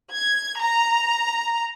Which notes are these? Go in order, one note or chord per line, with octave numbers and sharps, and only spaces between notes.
G#6
A#5